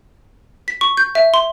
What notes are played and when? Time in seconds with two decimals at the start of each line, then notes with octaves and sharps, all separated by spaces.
0.68 B6
0.81 C#6
0.97 G6
1.15 E5
1.34 C6